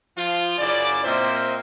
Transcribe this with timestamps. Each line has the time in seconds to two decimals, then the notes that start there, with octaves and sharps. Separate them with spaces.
0.17 F3 F4
0.58 F#2 C#3 E4 D5
1.05 A#2 C4 A#4 C5 D#5 E5